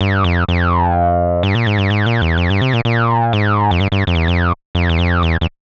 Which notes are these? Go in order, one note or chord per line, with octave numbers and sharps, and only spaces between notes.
G2
F2
F2
G2
A#2
G#2
G2
G#2
A#2
E2
F2
G2
C3
A#2
A#2
G#2
F2
G2
G2
F2
E2
F2
F2
E2
F2
E2
E2